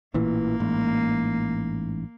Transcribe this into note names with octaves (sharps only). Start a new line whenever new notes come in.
A1 A#2 E3 A#3
A1 G#2